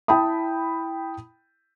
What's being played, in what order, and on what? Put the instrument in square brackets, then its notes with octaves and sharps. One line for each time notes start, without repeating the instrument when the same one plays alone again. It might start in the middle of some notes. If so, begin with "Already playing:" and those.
[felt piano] E4 G5 A5 B5 D#6